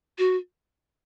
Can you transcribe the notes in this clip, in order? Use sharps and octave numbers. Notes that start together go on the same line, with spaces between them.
F#4